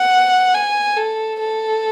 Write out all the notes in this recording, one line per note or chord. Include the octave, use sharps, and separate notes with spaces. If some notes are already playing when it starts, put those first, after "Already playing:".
Already playing: F#5
G#5
A4
A4